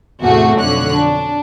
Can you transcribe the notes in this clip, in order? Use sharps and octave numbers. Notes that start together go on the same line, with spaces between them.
E2 A2 C3 A3 F#4 G#4
B1 F2 D3 C#5 F#6
D4